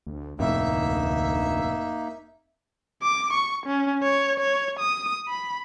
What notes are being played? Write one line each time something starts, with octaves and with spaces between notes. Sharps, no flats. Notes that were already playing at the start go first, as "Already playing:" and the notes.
D2
F1 D2 A2 A#3 D#4 E5
D6
C#6
C#4
C#5
C#5
D#6
B5